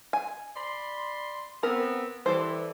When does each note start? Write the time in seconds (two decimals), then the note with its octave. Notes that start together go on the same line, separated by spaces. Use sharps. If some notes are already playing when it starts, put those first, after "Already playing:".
0.13 G#5
0.56 D5 B5 C6
1.63 B3 C4 A#4
2.26 E3 G3 A4 C5